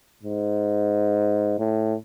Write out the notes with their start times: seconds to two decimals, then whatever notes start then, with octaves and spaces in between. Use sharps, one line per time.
0.23 G#2
1.59 A2